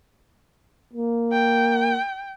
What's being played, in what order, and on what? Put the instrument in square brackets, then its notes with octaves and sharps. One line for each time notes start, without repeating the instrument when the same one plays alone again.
[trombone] A#3
[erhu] G5